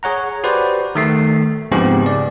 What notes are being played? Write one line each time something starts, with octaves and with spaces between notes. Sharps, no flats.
G#4 C#5 F#5 A#5
F#4 G4 B4 C5 D5
D#3 A3 C7
G#2 C#3 F3 B3 C4 G4
D5